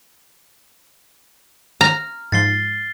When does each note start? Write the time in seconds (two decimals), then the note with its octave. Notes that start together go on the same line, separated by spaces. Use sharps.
1.81 A#5 F6
2.32 G#2 F3 A6 C7 G7